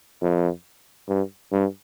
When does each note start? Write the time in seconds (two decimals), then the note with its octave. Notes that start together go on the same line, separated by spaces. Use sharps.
0.22 F2
1.08 G2
1.52 G2